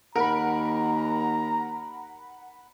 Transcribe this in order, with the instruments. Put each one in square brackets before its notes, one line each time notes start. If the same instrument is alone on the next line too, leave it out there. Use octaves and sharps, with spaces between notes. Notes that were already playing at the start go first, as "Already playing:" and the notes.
[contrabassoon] D#2 [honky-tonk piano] A#4 [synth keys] F#5 B5 [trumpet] A#5